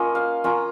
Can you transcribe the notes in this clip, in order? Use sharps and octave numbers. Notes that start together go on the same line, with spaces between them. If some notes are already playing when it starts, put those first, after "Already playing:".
Already playing: A#3 C#4 F4 D#5
F5
A#3 C#4 F4 A#5